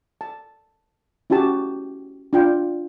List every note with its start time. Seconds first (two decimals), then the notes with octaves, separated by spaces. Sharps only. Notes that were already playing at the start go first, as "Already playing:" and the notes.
0.21 A5
1.30 C#4 E4 F#4 G4 A5
2.33 D4 F4 G5